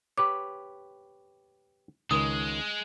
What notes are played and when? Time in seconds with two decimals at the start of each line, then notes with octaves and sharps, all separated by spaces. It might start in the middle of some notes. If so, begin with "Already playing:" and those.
0.18 G4 B4 C#5 D6
2.11 C#2 D#3 G#3 D#6